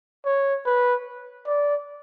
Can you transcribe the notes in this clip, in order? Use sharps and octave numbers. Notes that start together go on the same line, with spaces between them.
C#5
B4
D5